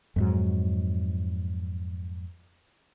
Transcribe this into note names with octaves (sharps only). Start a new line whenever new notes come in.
F2 G#2 F#3